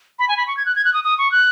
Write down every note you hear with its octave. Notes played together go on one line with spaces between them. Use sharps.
B5
G#5
B5
C#6
G#6
F#6
G#6
F#6
D#6
D#6
C#6
F#6